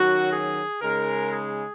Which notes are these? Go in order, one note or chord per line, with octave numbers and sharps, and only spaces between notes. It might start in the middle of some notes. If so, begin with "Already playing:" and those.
Already playing: D#3 F#3 C#4 F#4
G#4
C#3 G#3 D#4 A#4
G#4